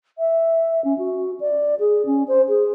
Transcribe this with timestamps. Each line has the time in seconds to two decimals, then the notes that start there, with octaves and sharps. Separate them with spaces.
0.18 E5
0.85 C#4
0.99 F#4
1.40 D5
1.80 G#4
2.06 C#4
2.28 C5
2.49 G#4